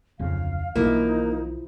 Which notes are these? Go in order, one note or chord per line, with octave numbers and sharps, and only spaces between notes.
D1 F2 C#3 F5
B1 B2 E3 F3 A#3 D#4 E4